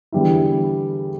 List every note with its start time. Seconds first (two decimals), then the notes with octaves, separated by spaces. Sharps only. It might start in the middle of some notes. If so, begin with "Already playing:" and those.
0.12 E2 D3 G3 B3 E4